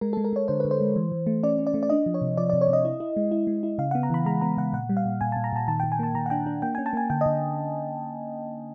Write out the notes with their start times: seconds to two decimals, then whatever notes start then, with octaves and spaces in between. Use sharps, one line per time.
0.01 G#3 A#4
0.13 G#3 A4
0.24 A#4
0.33 G#3 C#5
0.48 D3 C5
0.60 D3 B4
0.71 C5
0.81 G#3
0.96 E3
1.12 E3
1.27 A3
1.43 C#4 D5
1.59 C#4
1.67 D5
1.74 A3
1.83 D5
1.89 D4 D#5
2.06 F3
2.14 C#5
2.21 C3
2.37 F3 D5
2.50 C3 D5
2.61 C#5
2.68 C3 D#5
2.85 E4
3.00 E4
3.17 G#3
3.31 E4
3.47 G#3
3.63 E4
3.78 C#3 F5
3.91 B3 F#5
4.03 A#5
4.10 E3 B5
4.26 G#3 A#5
4.41 B3 A#5
4.57 C#3 F#5
4.73 A#2 F#5
4.89 G3
4.97 F5
5.05 A#2
5.21 A#2 G#5
5.32 A#2 A5
5.44 A#5
5.52 A#2 A5
5.68 D#3 A5
5.80 D#3 G5
5.92 G#5
5.99 A#3 A5
6.15 D#3 A#5
6.26 F#5
6.30 D4 G5
6.46 D4
6.62 A#3 G5
6.75 C#4 G#5
6.86 A5
6.93 A#3 G#5
7.10 D3 G5
7.21 D3 D#5